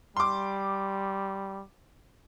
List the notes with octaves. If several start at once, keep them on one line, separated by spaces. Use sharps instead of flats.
G3 C6 D6